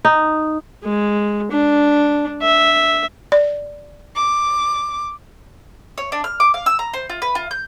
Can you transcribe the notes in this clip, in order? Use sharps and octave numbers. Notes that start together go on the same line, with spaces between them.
D#4
G#3
D4
E5
D5
D6
C#5
D4
F6
D6
F5
E6
A#5
C5
F4
B4
F4
G6